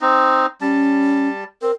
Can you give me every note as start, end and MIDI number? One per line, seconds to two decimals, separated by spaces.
0.01 0.46 60
0.01 0.46 63
0.61 1.44 55
0.61 1.28 61
0.61 1.44 81
1.62 1.71 60
1.62 1.73 70